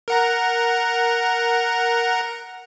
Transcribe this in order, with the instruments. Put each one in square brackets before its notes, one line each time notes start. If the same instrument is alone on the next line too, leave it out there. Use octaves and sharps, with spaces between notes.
[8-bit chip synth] A#4 F#5 A#5